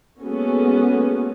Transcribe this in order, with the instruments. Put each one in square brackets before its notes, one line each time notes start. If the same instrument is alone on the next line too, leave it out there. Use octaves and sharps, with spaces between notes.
[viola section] G#3 A#3 B3 C#4 F#4 A4